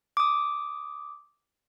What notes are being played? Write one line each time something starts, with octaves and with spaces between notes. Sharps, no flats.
D6 D#6